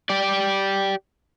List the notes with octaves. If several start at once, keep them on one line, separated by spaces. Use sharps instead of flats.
G4 D5